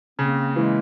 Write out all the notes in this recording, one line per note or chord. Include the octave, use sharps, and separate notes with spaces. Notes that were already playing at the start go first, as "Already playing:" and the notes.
C#3 A#3 C4
E3 G#3 A#3